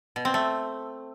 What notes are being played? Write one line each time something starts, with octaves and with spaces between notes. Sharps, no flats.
B2
C4
A3